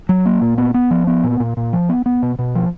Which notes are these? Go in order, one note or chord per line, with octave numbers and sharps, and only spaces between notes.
F#3
A#3
A#2
B3
B3
F3
B3
A#2
A#2
A#2
F3
B3
B3
B2
B2
F3